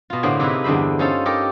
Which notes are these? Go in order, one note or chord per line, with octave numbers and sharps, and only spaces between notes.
B2 F4
A2 D3 A#3 G#4 C5 G#5
C3 D#4 E4 G#4 B4
E2 G2 D3 C5 B5
C#4 D#4 F4 A4 C5
D#4 G4 A4 A#4